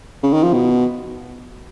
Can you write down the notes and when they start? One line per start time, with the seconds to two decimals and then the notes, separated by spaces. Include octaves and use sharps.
0.23 C#3
0.33 D#3
0.43 F3
0.53 B2